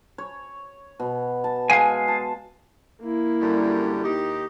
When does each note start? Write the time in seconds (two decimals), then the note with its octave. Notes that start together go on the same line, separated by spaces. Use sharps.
0.18 C#5
1.00 B2
1.44 A5
1.70 G#3 F5 G#5
2.08 A5
3.02 A#3 E4
3.41 F#2 D3 G3
4.03 D#2 D#4 G4